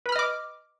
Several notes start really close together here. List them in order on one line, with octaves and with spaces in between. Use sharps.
B4 B5 F6 D#5 D6